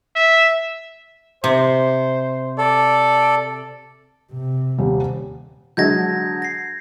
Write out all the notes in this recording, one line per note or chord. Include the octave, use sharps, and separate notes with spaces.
E5
C3 C5
A4 D5
C3
D#1 G3
D3 F#3 G#3 G6 G#6 A#6
A#6 C7